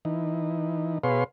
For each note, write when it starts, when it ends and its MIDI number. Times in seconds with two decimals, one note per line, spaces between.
0.05 0.98 52
0.05 0.98 63
1.04 1.24 47
1.04 1.24 68
1.04 1.24 71
1.04 1.24 73
1.04 1.24 77
1.04 1.24 84